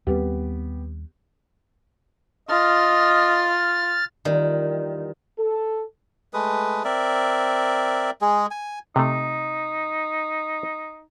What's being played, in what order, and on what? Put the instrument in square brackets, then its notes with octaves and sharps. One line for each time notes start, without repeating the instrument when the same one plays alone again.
[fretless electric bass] D#2 G3 C4 [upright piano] B3 G4
[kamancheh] F4 [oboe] D#5 [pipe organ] F6 A6
[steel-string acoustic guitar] E2 G3 F4 [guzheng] D#3
[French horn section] A4
[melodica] G#3 A3 B4 D#6
C4 A#4 D5 E5
G#3 G#4
G#5
[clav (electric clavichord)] C3 A3 [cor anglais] D#4